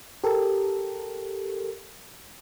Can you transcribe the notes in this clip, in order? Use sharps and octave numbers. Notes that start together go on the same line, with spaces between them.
G4 A4 A#4